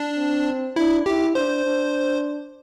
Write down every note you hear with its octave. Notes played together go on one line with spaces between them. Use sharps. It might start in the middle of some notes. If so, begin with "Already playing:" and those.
Already playing: D4
C4
D4 E4
E4 G4
D4 C5
D4